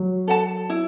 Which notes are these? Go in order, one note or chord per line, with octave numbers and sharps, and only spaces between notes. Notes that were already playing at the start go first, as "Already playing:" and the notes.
Already playing: F#3
A4 F#5 A5
E4